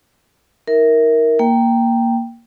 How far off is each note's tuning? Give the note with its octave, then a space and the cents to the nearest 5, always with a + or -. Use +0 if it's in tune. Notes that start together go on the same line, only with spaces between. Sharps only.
D#4 +40 A#4 +0 E5 -20
A#3 +0 G5 +0